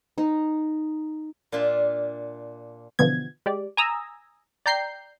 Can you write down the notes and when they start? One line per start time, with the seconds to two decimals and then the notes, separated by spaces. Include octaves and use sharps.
0.18 D#4
1.52 A#2 D4 F4 E5
2.99 B2 D3 E3 F3 B3 G#6
3.46 G#3 G4 D5
3.77 G#5 A#5 D#6 E6
4.66 D5 G5 A#5 G6 C7